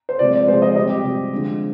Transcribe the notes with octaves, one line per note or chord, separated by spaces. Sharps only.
C5
C3 F3 G#3 D5
D5
C3 F3 G#3 C5
D#5
C3 G3 D#5
G4
C3 G3
D3 F3 G#3